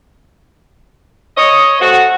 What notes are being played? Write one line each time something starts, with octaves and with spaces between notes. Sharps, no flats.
C#5 D#5
A3 C4 F#4